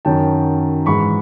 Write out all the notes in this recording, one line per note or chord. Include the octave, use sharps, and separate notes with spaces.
F#2 D#3 F#3 G5 A5
G#2 E3 B5 C#6